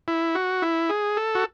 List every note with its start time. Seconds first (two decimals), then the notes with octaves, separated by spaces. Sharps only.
0.08 E4
0.35 F#4
0.62 E4
0.89 G#4
1.17 A4
1.35 F#4